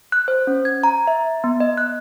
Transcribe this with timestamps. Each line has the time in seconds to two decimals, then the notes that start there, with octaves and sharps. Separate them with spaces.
0.12 F#6
0.28 C5
0.47 C#4
0.65 G#6
0.84 A#5
1.07 E5
1.44 B3
1.60 D#5
1.77 F#6